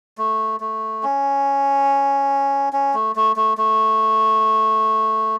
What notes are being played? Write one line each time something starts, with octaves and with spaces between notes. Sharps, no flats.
A3
A3
C#4
C#4
A3
A3
A3
A3